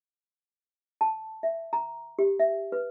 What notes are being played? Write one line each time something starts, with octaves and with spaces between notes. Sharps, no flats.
A5
E5
A#5
G4
E5
B4